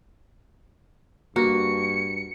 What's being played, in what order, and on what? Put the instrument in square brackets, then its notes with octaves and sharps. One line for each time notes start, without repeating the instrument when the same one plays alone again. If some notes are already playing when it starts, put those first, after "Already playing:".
[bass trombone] G2 [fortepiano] A#3 [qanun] F#4 [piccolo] C#7